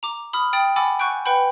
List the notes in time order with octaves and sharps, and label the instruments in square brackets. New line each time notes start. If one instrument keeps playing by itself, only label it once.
[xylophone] A#5 D6
B5 D#6 F6
G5 D#6 A6 F#7
F#5 G#5 B5 D6 E6 A6
F#5 G#5 C#6 F#6 G6 D7
B4 F#5 G5 B5 G6